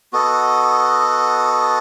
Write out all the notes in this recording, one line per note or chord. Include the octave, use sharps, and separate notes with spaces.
B3 F#4 A4 D#5